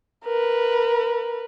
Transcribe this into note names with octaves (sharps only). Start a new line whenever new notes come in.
A#4 B4